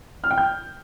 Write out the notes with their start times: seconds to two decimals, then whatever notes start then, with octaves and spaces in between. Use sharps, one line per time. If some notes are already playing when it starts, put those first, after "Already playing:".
0.24 F6
0.31 G5
0.38 G6